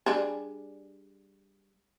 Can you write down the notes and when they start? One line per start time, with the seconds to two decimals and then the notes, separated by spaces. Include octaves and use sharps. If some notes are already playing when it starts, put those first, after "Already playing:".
0.06 G3 D4 G#4